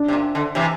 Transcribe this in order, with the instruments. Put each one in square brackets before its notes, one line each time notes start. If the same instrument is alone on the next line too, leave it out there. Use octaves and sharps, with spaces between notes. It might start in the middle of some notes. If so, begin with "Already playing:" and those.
Already playing: [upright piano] D4
[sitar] C3
A#2
D3
C3 E3